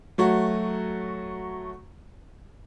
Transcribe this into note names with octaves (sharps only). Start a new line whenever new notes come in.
F#3 A3 F#4